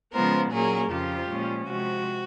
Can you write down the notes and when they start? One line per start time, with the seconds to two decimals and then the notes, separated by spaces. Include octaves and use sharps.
0.13 C#3 F3 G#3 B3 A#4 C5
0.52 A#2 F#3 A#3 C#4 G#4 A#4
0.91 F2 C#3 F3 F4 G4
1.30 A#2 F3 G#3 C#4
1.69 C3 F3 G#3 F#4